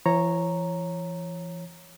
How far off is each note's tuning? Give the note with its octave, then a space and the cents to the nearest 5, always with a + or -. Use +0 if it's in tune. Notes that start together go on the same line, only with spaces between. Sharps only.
E3 +40 C#5 -10 A#5 +0